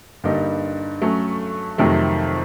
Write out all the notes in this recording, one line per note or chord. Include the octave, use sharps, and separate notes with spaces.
G2 D3 G3 A#3 D#4
F#3 A3 C#4
F2 C3 D#3 F#3 A3